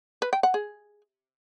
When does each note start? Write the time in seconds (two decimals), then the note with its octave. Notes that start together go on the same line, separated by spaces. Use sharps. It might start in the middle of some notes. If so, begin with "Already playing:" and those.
0.22 B4
0.33 G5
0.43 F#5
0.54 G#4